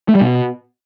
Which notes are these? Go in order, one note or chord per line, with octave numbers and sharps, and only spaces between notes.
A3
G3
B2